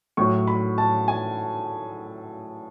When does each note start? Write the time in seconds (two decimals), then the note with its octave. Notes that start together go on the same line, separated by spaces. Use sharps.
0.17 A2 F#3 C#6
0.47 B5
0.78 A5
1.08 G#5